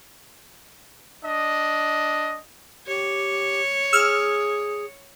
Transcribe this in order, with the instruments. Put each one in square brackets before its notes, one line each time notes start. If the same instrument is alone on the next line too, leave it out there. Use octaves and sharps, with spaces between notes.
[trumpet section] D4 D#5
[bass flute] G4 [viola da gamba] C#5
[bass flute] G#4 [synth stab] E6 F6